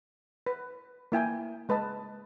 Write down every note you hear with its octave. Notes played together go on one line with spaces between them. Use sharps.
B4
A#3 E4 G5 G#5
G#3 B4 D#5 A5